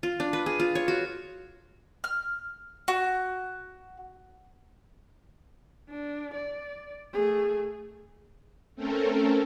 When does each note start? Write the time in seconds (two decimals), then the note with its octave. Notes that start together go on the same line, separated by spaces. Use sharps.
0.03 F4
0.20 D4
0.33 B4
0.46 G#4
0.60 F4
0.75 C#5
0.88 F#4
2.04 F6
2.88 F#4
5.90 D4
6.35 D5
7.13 A3 G#4
8.75 A3 C4 C#4 A4 A#4